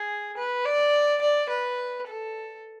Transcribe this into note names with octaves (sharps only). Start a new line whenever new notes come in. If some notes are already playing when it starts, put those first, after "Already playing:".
Already playing: G#4
B4
D5
D5
B4
A4